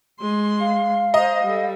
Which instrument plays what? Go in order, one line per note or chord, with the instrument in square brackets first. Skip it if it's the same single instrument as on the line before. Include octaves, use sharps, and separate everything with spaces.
[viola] G#3 C6
[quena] F5
[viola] C5 A#5 [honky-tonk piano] D#5
[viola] G3 A4